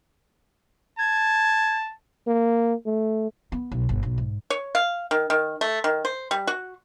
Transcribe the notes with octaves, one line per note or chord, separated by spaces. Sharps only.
A5 G#6
A#3
A3
B3
B1
G1
B1
G#2
C#5
F5
D#3
D#3
A3
D#3
C5
G3
F#4